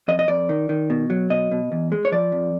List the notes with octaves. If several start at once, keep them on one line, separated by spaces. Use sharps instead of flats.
F2 D#5
D#5
F2 D5
D#3
D#3
B2
F#3
B2 D#5
B2
E2
G#3
C#5
F3 D5
F2